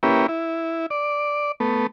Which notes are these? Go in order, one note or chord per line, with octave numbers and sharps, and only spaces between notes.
A#3 C#4 E4 G4 B4
E4
D5
A3 B3